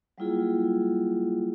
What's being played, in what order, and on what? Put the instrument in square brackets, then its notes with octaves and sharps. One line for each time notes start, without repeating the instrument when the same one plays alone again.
[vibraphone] F#3 G3 A#3 E4 F4 G#4